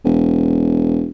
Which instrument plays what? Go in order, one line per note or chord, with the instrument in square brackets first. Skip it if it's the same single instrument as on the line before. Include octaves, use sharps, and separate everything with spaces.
[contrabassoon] E1